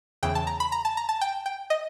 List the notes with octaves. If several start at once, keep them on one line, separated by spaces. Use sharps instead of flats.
E2 C#3 E3 G5
A5
A#5
B5
A#5
A5
A#5
A5
G5
G5
D#5